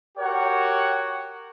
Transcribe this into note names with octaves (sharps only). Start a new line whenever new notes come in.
F#4 G4 A#4 C#5 F#5 G5